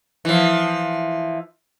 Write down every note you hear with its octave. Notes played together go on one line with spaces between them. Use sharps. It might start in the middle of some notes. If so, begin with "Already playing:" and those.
E3 F3